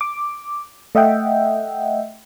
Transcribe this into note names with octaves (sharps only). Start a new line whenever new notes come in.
D6
A3 D#5 E5 F#5 G5